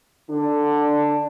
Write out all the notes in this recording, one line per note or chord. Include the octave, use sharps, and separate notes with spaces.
D3 D4